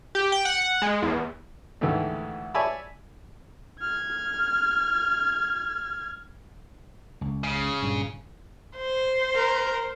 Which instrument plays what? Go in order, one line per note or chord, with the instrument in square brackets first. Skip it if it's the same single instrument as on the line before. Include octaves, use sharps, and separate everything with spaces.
[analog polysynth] G4
G5
F#5
G#3
E2
[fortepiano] D2 G#2 D#3 E3 A3
C#5 D5 E5 G#5 A5 B5
[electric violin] F6 G#6
[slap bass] C#2
[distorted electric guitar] C#3
[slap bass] G2 A#2 D3
[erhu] C5
[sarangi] A#4